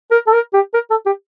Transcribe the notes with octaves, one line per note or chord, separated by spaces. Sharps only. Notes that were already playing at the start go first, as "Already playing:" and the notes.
A#4
A4
A#4
G4
A#4
A4
G4